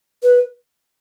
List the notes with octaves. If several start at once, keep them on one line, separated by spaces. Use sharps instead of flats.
B4